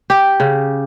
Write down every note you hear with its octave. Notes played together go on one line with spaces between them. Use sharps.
G4
C#3